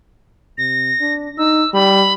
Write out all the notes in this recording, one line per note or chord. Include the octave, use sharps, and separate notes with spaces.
C3 A#6
D4
D#4 E6
G3 B5